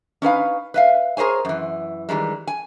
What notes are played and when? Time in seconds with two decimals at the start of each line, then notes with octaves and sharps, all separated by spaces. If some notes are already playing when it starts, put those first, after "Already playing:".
0.22 C#4 D#4 B4 F5
0.74 B4 E5 F5
1.17 G#4 A#4 C5 C#5 G#5
1.45 F#2 E3
2.09 D#3 E3 G3 G#3
2.47 G#5